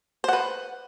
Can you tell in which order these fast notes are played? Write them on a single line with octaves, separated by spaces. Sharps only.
C5 F#5 B4